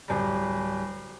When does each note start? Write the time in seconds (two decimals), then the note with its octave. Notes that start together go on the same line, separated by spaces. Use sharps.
0.08 D1 G3